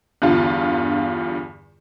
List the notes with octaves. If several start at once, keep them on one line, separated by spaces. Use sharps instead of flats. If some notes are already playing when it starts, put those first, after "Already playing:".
E2 G2 D3 F4